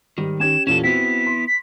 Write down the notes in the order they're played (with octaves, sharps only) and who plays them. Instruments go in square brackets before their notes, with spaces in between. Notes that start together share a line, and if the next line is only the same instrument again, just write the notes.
[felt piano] G#2 G3 [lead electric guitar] D#3
[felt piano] C#4 G4 G#6 [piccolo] E7
[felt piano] E2 A#2 G4 [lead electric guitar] C#4 A4 [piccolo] E7
[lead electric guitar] B3 E4 [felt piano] C4 F#4 [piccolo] B6
[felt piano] C6
[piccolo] B6